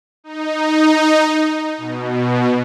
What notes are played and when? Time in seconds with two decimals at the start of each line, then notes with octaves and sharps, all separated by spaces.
0.24 D#4
1.78 B2